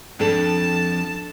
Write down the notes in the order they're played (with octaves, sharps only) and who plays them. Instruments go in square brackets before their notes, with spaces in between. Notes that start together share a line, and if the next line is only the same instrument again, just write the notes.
[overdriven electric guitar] F2 [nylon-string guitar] D4 A4 [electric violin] A5